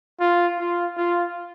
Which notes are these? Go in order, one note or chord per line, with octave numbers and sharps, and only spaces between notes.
F4
F4
F4